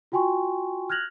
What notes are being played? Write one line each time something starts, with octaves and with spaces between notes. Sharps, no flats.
F4 F#4 G5 G#5 C6 C#6
F6 F#6 G#6 A#6 F7 F#7